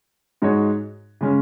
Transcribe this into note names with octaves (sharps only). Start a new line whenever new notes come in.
G#2 G#3 D#4 F#4 C#5
C#3 G#3 C#4